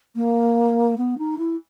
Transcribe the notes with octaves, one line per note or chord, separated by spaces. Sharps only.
A#3
B3
D#4
E4